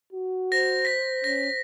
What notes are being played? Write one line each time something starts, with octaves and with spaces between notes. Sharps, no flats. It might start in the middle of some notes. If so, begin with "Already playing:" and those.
F#4
C5 A#6
A#6 B6
C#4 A#6